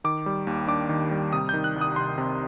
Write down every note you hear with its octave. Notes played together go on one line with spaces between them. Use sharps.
D#3 D6
G3
D#2
D4 D6
D#3
G3
C3 D#6
D#3 G6
F#6
C2
D#6
C2 C6
C3